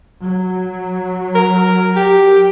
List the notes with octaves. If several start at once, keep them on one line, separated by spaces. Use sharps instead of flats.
F#3
A#4
G4